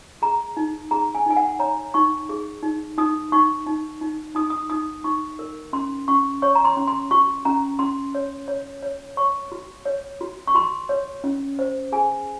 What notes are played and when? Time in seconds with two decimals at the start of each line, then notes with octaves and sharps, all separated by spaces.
0.22 G#4 A#5
0.57 D#4
0.91 G#4 A#5
1.15 G#5
1.26 D#4 G#5
1.36 F#5
1.59 C#5 A#5
1.94 D#4 C#6
2.29 G#4
2.63 D#4
2.98 D#4 D#6
3.32 D#4 C#6
3.66 D#4
4.01 D#4
4.35 D#4 D#6
4.50 D#6
4.70 D#4 D#6
5.04 D#4 C#6
5.39 A#4
5.73 C#4 C6
6.08 C#4 C#6
6.42 C#5 C#6
6.55 A#5
6.65 C6
6.77 C#4
6.88 C6
7.11 F#4 C#6
7.45 C#4 A#5
7.79 C#4 C6
8.15 C#5
8.48 C#5
8.83 C#5
9.17 C#5 C#6
9.52 F#4
9.85 C#5
10.21 F#4
10.47 C#6
10.55 F#4 C6
10.89 C#5
11.24 C#4
11.59 C5
11.92 G#4 G#5